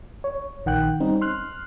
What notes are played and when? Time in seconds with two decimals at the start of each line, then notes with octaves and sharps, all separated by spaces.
0.24 C#5
0.66 A#1 D#3 F#5 G5 F#6
1.00 G3 C4 C#4 D#4
1.21 C6 F6 F#6